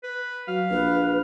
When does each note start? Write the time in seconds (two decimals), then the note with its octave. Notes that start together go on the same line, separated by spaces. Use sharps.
0.03 B4
0.48 F#3 F5
0.70 A#1 B4